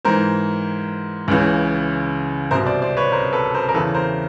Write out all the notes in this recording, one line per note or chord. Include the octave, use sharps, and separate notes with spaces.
G#2 E3 A#4 C5
C#2 C#3 E3
C2 B2 A#4 C5
C5 D5
C5 D5
B4 C#5
A#4 C5
A4 B4
A#4 C5
A#4
E2 C#3 E3 A4 B4
A#4 C5